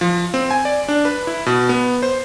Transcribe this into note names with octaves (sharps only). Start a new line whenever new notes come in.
F3
C4
G#5
D5
D4
B4
E4
B2
B3
C5